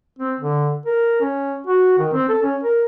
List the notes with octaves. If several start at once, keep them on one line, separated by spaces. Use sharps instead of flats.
C4
D3
A#4
C#4
F#4
D#3
C4
A4
C#4
A#4